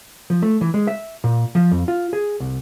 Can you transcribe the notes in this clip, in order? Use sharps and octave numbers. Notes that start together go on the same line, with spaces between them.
F3
A3
E3
G#3
E5
A#2
F3
F2
F4
G#4
C2